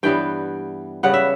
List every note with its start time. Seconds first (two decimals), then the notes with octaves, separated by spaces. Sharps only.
0.03 G2 E3 G3 B3 G5
1.03 C#3 G3 B3 F#5
1.14 E5